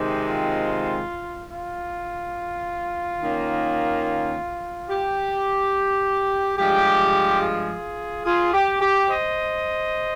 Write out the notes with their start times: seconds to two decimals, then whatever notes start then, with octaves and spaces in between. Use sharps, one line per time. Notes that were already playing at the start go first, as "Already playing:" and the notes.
Already playing: C3 D#3 G#3 C4 D#4 G4
0.26 F4
1.52 F4
3.21 D#3 A#3 C#4
4.89 G4
6.57 G2 F3 G#3 G4
7.41 F4 G#4
8.25 F4 G#4
8.53 G4
8.81 G4
9.09 C5 D#5